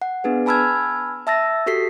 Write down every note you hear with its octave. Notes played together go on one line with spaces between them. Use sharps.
F#5
B3 D4 G#4 B4
G#5 A5 B5 E6 F6 G#6
E5 A5 E6 A6 A#6
F#4 G4 A4 B6 C7